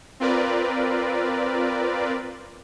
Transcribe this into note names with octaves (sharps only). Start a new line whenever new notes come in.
C4 F4 A#4 B4 D5